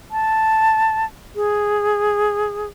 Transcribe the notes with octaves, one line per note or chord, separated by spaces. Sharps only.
A5
G#4